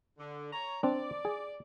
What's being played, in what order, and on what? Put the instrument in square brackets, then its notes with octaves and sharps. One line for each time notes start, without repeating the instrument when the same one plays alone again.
[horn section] D3
C#5 A#5
[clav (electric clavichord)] C4 D4 [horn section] D5
[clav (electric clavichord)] G#4